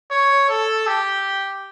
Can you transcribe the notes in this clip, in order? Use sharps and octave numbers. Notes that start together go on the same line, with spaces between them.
C#5
A4
G4